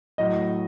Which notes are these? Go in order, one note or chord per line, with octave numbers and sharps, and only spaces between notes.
A2 F#3 D#5